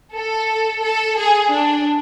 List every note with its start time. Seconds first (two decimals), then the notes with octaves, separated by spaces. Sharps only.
0.14 A4
0.83 A4
1.18 G#4
1.51 D4